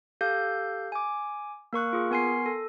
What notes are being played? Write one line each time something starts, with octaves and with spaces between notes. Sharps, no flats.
G4 A4 F5 G6
G#5 D6
A#3 A#4 C#6 F#6
F4 G#4
B3 A#4 G#5 C6 C7
A4